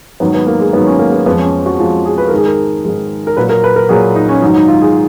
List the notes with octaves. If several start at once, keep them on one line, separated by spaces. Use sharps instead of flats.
G#2 D#3 F#3 B3
B3
A#3
G#3
G#2 D#3 F#3 B3
C#4
A#3
B3
F2 F3 G#3 B3
C#4
F#4
F2 F3 G#3 F4
G#4
B4
G#2 D#3 G#3 A#4
G#4
A#4
G#2 D#3 G#3
A#4
A#2 F#3 B4
A#4
B4
A#4
A#2 F#3 G#4
D#4
C#4
G#2 D#3 F#3 D#4
D#4
F4
G#4